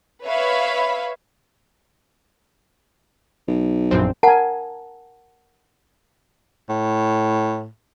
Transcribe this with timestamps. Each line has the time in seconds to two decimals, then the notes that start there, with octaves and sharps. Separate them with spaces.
0.23 B4 C#5 E5 F5 B5
3.48 B1
3.91 A#1 F#2 C4
4.23 A#4 F#5 G#5 A5
6.69 A2